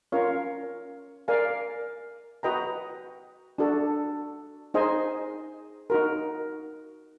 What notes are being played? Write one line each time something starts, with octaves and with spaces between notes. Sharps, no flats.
C#4 F4 A#4 C#5 F5
A#4 D5 F5 G#5
F#4 B4 D#5 G5 A#5
D4 F#4 A4
D#4 G#4 C5 D#5 G#5
D#4 F#4 A#4